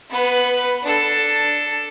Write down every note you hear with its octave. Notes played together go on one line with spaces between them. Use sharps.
B3 B4
D4 A4